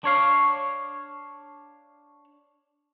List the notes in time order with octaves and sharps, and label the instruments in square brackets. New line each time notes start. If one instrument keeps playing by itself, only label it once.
[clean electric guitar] D4 C#5 F5